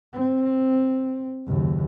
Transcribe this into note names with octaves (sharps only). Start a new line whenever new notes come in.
C4
F#1 D#2